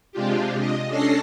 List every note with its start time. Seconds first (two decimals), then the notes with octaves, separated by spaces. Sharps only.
0.12 C3 G#3 D4 F4 G4
0.57 D#5
0.88 C#4 D4 A4 A#6 C7